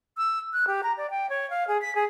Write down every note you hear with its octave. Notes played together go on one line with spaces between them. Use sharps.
E6
F#6
G4
A#5
D5
G5
C#5
F5
G#4
B6
G#4